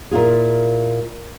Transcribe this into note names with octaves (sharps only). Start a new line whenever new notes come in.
A#2 E4 F4 G#4